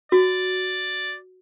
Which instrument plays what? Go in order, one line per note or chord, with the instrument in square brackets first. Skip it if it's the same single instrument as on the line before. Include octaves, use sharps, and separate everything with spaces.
[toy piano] F#4 [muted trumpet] D5